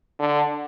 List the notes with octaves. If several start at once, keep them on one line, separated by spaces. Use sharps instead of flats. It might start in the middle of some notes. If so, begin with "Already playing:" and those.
D3